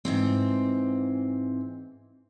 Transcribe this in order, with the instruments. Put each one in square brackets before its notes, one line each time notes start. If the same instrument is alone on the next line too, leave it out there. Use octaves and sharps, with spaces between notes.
[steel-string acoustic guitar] G#2 E3 C4